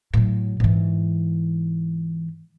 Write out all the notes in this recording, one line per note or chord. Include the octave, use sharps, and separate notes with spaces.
A2 F#3
G#2 E3